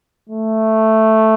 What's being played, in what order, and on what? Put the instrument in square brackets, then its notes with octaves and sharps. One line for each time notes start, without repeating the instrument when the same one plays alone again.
[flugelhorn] A3